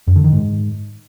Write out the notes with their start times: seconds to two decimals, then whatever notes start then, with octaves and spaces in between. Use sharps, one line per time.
0.07 F#2
0.16 D3
0.24 D#3
0.33 G#2